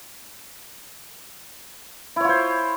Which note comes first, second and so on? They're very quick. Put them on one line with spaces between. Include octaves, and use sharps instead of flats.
E4 C#5 F4 C5